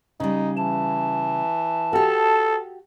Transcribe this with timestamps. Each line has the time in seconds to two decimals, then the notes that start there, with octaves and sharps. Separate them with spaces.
0.20 C#3 G3 D#4
0.57 E3 A5
1.93 F#4 G4 A4